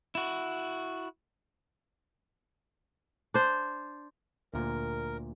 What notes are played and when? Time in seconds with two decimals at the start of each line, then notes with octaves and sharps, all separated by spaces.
0.15 E4 F#4
3.34 D4 C5
4.54 D2 A#2 A#4